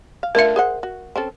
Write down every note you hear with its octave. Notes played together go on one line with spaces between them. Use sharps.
F5
A3 D4 F4 A#4 E5
G#4 C5 F#5
F#4
C4 C#4 A4